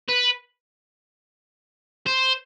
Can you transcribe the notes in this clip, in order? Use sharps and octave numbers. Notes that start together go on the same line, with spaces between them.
B4
C5